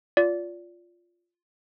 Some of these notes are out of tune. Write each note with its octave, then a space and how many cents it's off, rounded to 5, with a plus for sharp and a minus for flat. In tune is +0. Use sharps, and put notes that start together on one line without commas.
F4 +0 D5 -20